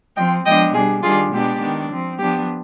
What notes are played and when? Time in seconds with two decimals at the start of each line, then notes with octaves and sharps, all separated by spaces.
0.16 F3 C4 D#5 G5
0.45 F3 G#3 B3 D4 D#5 G5
0.73 B2 G3 D4 F4 G#4
1.02 D#3 G3 D4 F4 G#4
1.32 B2 G#3 B3 D4 G4
1.60 D#3 B3 D4
1.90 F3 C4
2.18 F3 B3 D4 G4